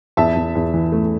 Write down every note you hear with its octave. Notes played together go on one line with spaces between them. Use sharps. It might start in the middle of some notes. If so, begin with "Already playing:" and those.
E2 E5 A5
E2
E2
E3
A3